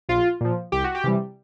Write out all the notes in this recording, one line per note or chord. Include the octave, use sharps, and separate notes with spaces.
A#1 F4
A#2 F3
C2 G4
F#4
G4
C3 E3 G3